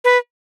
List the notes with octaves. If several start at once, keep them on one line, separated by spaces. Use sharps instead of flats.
B4